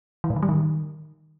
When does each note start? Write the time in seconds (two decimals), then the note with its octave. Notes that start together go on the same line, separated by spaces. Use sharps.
0.24 E3
0.30 A2
0.36 D#3
0.43 G3
0.49 D#3